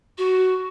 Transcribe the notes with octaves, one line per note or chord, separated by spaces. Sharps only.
F#4